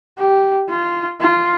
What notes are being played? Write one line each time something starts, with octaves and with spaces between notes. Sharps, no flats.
G4
F4
F4